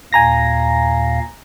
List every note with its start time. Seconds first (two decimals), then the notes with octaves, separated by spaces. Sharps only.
0.13 D#2 A#2 F5 G#5 A#5 A#6